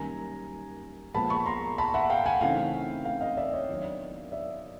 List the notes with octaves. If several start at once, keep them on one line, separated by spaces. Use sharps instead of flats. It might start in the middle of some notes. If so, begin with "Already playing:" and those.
Already playing: F#2 D#3 G3 A#3 D#4 G#5 A#5
A#2 F3 G#3 B3 A5 B5
B5 C#6
A#5 C6
A5 B5
E5 F#5
F5 G5
F#5 G#5
C#3 E3 A3 C4 D#4 F5 G5
F5 G5
D#5 F5
D5 E5
C#5 D#5
D#3 F#3 B3 D4
D5 E5